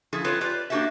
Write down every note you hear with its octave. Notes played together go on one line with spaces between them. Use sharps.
F3 E4 G#4 A4
C4 F4 A4 B4 C#5
F4 G4 B4 D5
A#3 D4 F#4 G4 A4 E5